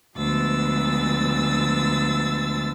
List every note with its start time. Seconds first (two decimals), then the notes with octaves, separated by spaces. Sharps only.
0.17 D2 F3 G#3 B3 E6 A6